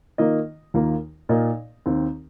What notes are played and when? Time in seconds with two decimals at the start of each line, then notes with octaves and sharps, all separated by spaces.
0.18 D#3 A#3 F4 D#5
0.74 D#2 D#3 A#3 F4 A#4
1.29 A#2 A#3 D#4 A#4 D#5
1.86 D#2 D#3 C4